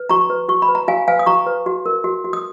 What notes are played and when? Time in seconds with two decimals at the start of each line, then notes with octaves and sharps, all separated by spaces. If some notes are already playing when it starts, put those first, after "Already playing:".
Already playing: B4
0.09 F#4 A#5 C#6
0.30 B4
0.48 F#4 C#6
0.62 B5
0.69 B4
0.75 A#5
0.88 F#4 F5 G#5
1.08 B4 F5 G#5
1.19 D#6
1.26 F#4 A#5 C#6
1.47 B4
1.66 F#4
1.86 A#4
2.04 F#4
2.24 F#4
2.33 D#6